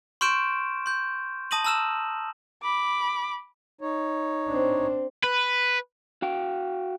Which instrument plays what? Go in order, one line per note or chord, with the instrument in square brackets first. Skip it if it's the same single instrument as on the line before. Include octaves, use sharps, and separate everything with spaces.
[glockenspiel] C6 C#6 F6 G6 D7 E7
C6 G6
A5 D#6 A#6 D#7 F#7
A5 A#5 E6 F6 E7 F#7
[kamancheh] B5 D6
[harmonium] D#4 C#5
[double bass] C4 D4
[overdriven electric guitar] B4
[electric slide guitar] F#4 F5 G5